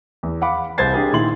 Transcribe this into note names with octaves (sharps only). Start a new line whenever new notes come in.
E2
F5 F#5 B5 D6
C2 G#3 C5 G#6 A6 C7
D4 G4 G#4 A#4
A#2 D#3 E4 C6 F#7